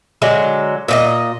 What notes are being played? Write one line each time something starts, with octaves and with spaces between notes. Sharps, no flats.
D3 F#3 G#3
A#2 G4 D#5